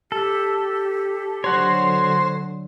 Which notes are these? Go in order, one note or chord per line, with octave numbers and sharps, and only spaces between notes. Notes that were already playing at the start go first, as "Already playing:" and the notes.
G4 A4
D3 F#3 F#4 C5 C#5